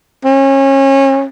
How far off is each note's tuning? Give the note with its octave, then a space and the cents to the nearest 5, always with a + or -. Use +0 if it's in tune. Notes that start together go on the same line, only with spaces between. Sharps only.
C#4 -30